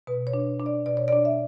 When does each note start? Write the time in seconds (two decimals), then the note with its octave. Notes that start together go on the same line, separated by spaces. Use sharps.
0.07 B2 B4
0.27 C#5
0.34 D4
0.60 D4
0.66 D5
0.86 B2 D5
0.97 C#5
1.08 D5
1.13 D4
1.25 E5